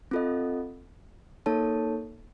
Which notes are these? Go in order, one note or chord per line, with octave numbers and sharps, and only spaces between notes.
C4 F4 A4 D#5
A#3 D#4 A4 C#5 A5